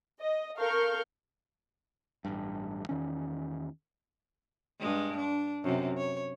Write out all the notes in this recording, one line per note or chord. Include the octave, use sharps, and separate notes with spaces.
D#5
A4 A#4 F5 C#6 F6 G6
A1 G2
E2 D#3 C#4
G2 G#3
D4
F#2 C3
C#5